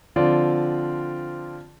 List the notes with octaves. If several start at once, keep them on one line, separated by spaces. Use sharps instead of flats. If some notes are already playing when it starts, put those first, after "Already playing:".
D3 F3 C4 F4 D5